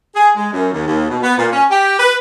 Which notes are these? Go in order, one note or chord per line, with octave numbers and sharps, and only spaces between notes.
G#4
G#3
F#2
D#2
D#2
B2
B3
A#2
C#4
G4
B4